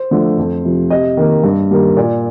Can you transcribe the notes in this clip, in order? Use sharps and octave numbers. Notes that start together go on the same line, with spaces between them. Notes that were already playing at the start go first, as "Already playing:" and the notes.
Already playing: C5
D3 F3 A3
F2
C3 F3
C3 D#5
D#3 A#3
G2
D#3 G3 A#3
A#2 D5